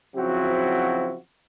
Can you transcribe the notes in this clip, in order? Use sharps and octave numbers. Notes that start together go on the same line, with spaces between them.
C#3 F3 F#3 C4 E4 F#4